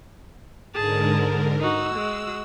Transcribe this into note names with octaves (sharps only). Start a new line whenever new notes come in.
G#2 D3 G#4 A#4 A5
D#4 F#4 E6
G#3 F#4